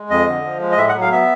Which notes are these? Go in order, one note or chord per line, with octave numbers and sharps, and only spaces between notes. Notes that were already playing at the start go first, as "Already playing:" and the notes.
Already playing: G#3
F2 D#5
D3
F3
G#3
D#5
A2 E5
F#5
F#3
F5
B3 E5